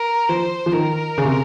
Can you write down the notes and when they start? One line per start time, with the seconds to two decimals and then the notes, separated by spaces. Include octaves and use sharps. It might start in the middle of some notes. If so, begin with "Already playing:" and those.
Already playing: A#4
0.29 F3 C5
0.66 F3
0.72 D#3 A#4
1.18 C#3
1.25 C3